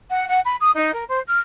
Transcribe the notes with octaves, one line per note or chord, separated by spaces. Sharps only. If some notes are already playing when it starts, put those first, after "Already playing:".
F#5
F#5
B5
D#6
D#4
A#4
C5
F6